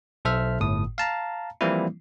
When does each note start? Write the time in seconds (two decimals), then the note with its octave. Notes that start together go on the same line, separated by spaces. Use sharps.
0.25 B1 A4 C5 E5 F6
0.60 G1 A2 D#6
0.98 F5 A5 A#5
1.61 E3 F3 G3 A#3 C4 E4